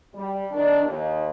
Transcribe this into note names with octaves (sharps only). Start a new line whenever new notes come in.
G3
D#3 D4
D#2